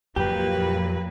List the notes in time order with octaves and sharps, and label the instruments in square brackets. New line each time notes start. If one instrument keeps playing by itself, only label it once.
[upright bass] F2 [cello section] A#2 F#3 A#3 [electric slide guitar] G4 [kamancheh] B4